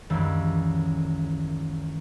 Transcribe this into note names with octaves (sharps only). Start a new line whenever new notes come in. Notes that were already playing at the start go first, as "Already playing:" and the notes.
C#2 F#2 D#3 E3 G3